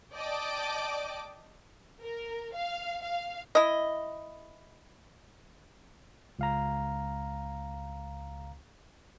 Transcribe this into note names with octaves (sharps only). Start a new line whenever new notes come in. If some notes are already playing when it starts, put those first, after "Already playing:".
D5 D#5 G5 A5 D6
A#4
F5
F5
E4 D#5
C#2 F5 A#5